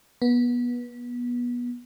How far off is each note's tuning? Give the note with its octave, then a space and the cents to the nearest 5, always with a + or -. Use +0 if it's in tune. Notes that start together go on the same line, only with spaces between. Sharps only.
B3 -25